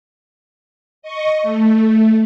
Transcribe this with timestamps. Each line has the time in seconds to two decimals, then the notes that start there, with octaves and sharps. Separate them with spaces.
1.02 D#5 C#6
1.42 A3